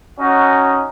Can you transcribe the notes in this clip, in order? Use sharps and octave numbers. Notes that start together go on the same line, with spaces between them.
C#4 D#4 F#4